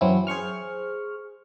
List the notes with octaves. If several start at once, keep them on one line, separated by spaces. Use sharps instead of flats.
F#2 E3 F#3 C4 C#4 E4
G#4 C5 C#6 F6